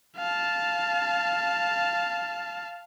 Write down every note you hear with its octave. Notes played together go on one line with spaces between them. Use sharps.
F5 A5